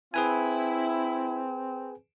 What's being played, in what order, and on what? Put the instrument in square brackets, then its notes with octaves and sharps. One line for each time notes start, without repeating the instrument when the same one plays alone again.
[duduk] C4 [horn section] E4 [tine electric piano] G#4 B4 G#5